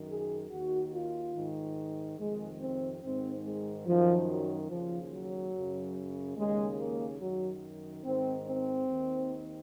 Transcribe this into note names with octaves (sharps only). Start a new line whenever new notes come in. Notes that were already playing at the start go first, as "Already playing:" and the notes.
Already playing: F#2 D#3
G#4
D#2 D#3 F#4
F4
G#2 D#3
F2 C3 D#3 G#3
C4
G#2 D#3 C4
G#3
F#2 D#3 F3
F#3
D#2 C#3 F3
F#3
F#2 C#3
D#2 C#3 G#3
A#3
F#2 D#3 F#3
G#2 D#3 C4
C4
D#2 D#3